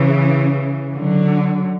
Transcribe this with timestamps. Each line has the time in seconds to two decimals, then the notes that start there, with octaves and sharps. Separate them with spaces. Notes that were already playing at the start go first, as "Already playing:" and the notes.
Already playing: C#3 E3
0.96 D3 F#3